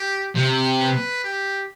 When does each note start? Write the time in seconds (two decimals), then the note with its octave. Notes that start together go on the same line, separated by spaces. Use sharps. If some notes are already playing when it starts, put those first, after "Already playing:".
Already playing: G4
0.35 C3
0.80 B4
1.24 G4